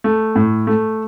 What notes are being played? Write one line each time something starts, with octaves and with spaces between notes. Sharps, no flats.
A3
A2
A3